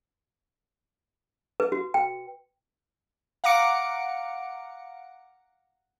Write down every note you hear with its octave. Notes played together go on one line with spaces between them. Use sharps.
B4
F#4
G5
F5 F#5 A#5 D6 C#7 D7